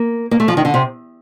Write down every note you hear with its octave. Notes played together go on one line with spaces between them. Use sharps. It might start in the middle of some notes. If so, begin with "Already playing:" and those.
Already playing: A#3
A#3
A3
F3
D#3
D3
C3